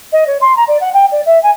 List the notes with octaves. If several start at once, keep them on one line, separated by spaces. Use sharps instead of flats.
D#5
C#5
C6
A#5
D5
F#5
G5
D5
E5
G#5